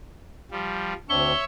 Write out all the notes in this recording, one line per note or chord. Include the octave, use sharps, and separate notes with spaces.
F3 G3
D2 C4 D4 C#5 E5 C#6 G7